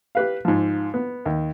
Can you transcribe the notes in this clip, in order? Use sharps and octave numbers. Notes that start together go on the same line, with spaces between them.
G4 B4 F5
G#2 F3
B3
D#2